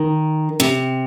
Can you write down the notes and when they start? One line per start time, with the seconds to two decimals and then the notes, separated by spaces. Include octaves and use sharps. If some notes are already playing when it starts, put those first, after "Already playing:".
Already playing: D#3
0.60 C3